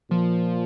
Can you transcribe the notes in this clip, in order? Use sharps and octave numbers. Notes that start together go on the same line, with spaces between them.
A#2 F3